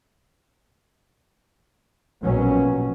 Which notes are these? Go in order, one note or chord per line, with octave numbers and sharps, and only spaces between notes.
A#1 B2 F#3 C#4